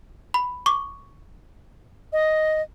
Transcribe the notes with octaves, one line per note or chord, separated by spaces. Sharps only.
B5
C#6 D6
D#5